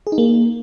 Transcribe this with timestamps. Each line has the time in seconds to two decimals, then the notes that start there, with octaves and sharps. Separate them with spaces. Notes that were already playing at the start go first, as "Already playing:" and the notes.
0.07 G#4
0.12 D#4
0.18 A#3